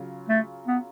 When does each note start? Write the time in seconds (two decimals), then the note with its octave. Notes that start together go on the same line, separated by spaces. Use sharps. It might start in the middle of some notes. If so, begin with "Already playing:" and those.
Already playing: C#3 F#3 F4
0.29 A3
0.67 B3